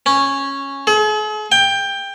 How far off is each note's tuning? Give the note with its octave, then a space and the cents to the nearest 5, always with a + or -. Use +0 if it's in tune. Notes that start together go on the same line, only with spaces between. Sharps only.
C#4 -5
G#4 +45
G5 +15